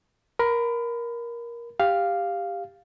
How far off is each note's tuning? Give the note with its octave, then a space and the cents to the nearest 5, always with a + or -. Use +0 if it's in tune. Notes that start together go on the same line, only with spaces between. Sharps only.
A#4 +15 B5 +30
G4 +15 F5 +0